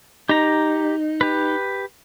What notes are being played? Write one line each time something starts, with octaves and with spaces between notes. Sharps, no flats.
D#4 G4 A#5
G4 B4